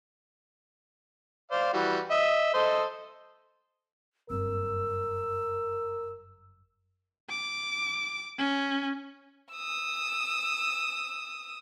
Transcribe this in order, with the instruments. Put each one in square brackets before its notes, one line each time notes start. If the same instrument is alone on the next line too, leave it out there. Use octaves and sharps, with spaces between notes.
[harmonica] C5 D5 F5
E3 G3 F#4
D#5 E5
A4 C5 D#5
[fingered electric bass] F#1 G2 C4 [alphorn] A#4 [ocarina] E6
[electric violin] D6
C#4
[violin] D#6 E6